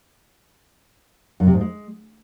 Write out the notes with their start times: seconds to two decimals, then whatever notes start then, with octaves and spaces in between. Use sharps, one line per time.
1.40 F#2
1.47 C3
1.54 G#2
1.61 G#3